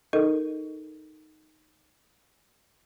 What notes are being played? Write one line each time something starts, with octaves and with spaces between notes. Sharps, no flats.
D#4 A4 A#4 D#5